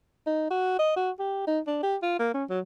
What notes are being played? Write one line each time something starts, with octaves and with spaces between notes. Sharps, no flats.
D#4
F#4
D#5
F#4
G4
D#4
D4
G4
F4
A#3
C#4
F#3